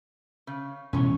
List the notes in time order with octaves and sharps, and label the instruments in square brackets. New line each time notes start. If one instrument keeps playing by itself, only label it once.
[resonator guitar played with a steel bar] C#3
[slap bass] E1 A2 [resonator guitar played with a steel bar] C#4 C#5